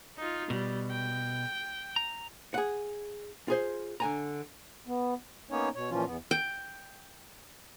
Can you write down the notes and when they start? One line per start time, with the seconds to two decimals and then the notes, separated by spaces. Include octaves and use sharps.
0.17 D#4 F4
0.50 B2 G3
0.91 G5
1.96 A#5
2.54 G#4 F#5
3.48 F4 G#4 C5
4.00 D3 G#5 A#5
4.87 B3
5.51 A#3 B3 C#4 D#4 C#5
5.75 B2 C#5
5.91 A#2 E3 F3 C#4 F4
6.06 E2 B3
6.31 G5